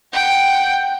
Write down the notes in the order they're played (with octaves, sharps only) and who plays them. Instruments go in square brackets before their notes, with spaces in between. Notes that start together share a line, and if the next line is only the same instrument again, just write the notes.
[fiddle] F#5 G5